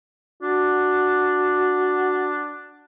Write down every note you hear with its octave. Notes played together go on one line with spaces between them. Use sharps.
D4 F#4